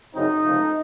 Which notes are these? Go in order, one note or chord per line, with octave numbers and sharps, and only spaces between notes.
F#2 C#3 F#3 C4 D#4
C#2 C3 F3 A3 C4